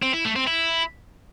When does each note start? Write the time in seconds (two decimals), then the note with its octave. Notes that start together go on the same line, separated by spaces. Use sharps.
0.02 C4
0.14 E4
0.25 A3
0.36 C4
0.47 E4